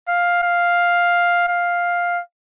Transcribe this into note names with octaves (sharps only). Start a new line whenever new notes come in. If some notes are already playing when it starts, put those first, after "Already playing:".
F5
F5
F5